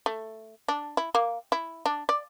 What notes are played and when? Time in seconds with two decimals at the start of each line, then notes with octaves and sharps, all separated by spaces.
0.06 A3
0.68 D4
0.97 E4
1.15 A#3
1.52 E4
1.86 D4
2.09 D5